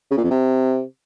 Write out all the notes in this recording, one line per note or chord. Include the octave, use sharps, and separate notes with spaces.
C#3
A#2
F2
C3